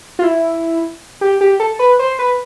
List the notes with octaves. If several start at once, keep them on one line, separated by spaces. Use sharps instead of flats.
F4
E4
G4
G4
A4
B4
C5
B4